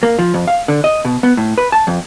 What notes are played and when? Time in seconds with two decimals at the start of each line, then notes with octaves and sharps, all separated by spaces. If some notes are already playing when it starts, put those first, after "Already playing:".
0.03 A#3
0.19 F3
0.34 F2
0.48 F5
0.68 D3
0.84 D#5
1.05 B2
1.23 B3
1.37 A2
1.58 B4
1.72 A5
1.87 F2